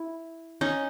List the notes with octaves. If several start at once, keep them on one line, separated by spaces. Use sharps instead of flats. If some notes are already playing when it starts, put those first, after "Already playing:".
Already playing: E4
C#4 D#4